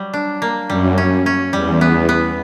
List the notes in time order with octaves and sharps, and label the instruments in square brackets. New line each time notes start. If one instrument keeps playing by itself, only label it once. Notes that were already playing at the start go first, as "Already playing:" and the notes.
Already playing: [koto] F#3 G3
D4
A#3
[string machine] F#2 [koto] G3
[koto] C#4
C#4
[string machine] E2 [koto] G3
[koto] B3
B3